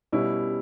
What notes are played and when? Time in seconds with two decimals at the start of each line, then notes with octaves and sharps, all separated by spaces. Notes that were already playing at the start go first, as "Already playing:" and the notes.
0.12 B2 G3 C#4 E4